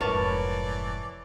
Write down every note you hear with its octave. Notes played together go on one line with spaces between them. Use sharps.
F1 G#2 E3 A#4 B4 C#5 D5 A5